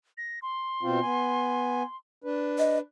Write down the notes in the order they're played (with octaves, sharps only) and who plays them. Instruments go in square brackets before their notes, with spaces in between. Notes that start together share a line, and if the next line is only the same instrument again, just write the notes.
[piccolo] A#6
C6
[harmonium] B2 C4 F4
B3 G#5
D4 B4
[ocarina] D#5